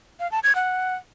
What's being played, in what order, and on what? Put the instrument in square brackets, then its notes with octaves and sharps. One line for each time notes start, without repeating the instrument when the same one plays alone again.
[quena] F5
A5
G#6
F#5